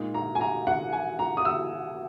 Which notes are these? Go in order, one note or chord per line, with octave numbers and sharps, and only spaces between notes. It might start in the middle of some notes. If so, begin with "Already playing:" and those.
Already playing: A#2 G#3 D#4
A#5
G#5
A#5
F#5
G#5
A#5
D#6
E6